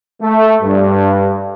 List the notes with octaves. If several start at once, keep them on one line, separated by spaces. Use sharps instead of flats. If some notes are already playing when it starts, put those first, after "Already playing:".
A3
G2